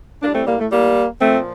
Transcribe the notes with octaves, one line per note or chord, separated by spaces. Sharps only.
A2 G3 A#3 D4
A3 C4
G3 A#3
A3
G3 A#3
A#2 F3 A3 C4